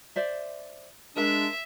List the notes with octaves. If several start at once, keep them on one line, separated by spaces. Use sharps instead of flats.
C5 D5 E5
G#3 D4 A#4 E5